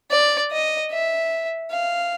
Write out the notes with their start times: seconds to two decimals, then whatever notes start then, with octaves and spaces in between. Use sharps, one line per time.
0.11 D5
0.52 D#5
0.91 E5
1.71 F5